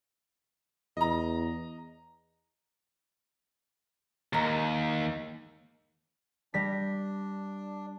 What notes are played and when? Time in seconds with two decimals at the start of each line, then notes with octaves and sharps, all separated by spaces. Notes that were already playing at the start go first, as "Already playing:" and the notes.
0.97 E2 D#5 A#5
4.33 D#2 G#2 A#5
6.54 G3 D4 A#6 B6